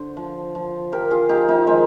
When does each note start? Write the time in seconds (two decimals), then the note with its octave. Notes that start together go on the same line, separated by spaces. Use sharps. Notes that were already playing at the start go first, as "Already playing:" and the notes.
Already playing: D3 C5
0.17 F3
0.55 F3
0.92 F3 G4 A#4
1.10 F4 G#4
1.29 F3 D#4 G4
1.48 C4 D#4
1.67 D#3 G#3 C4